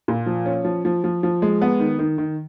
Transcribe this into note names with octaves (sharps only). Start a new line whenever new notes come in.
A#2
F3
C#4
F3
F3
F3
F3
G#3
B3
D#3
D#3
D#3